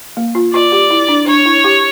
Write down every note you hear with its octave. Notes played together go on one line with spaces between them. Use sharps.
A#3
F4
F4 D5
G4
E4
D4
D4 C#5
E4
G4